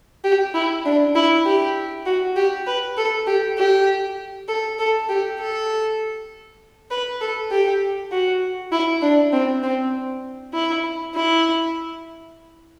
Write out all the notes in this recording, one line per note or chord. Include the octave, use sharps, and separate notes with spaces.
G4
E4
D4
E4
G4
F#4
G4
B4
A4
G4
G4
A4
A4
G4
A4
B4
A4
G4
F#4
E4
D4
C4
C4
E4
E4